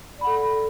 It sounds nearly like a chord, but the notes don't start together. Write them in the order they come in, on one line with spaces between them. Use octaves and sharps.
D5 B5 F#5 A4